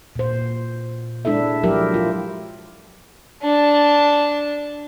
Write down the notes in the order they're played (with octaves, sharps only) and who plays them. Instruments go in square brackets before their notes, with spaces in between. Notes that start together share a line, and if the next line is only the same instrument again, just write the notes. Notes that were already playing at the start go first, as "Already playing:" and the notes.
[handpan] A#2 C5
G#3 D4 E4 A4 E5
F3 F#3 E4 G4 A#4 E5
F4
[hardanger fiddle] D4 A5